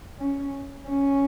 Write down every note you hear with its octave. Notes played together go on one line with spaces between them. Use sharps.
C#4
C#4